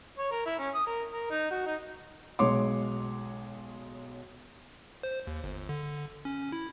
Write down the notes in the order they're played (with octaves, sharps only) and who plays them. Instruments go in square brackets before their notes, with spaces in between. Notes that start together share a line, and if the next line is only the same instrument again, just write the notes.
[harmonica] C#5
A#4
E4
C#4
D#6
A#4
A#4
D#4
F#4
D#4
[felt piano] B1 B2 G#3 C#5 C6 D6
[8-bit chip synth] C5
D#2
G1
D3
C#4
E4